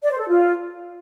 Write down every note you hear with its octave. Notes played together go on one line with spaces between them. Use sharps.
D5
C5
A4
F4